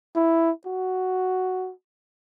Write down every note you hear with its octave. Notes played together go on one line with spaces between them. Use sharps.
E4
F#4